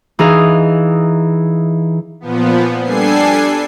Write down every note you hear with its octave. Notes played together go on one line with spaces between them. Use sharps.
E3 D#4 G#4 F5
A#2 F3 B3
G3 D4 A4 G#5 C7